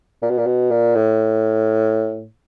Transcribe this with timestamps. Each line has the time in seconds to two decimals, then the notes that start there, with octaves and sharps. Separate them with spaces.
0.22 A#2
0.30 B2
0.38 A#2
0.46 B2
0.71 A#2
0.95 A2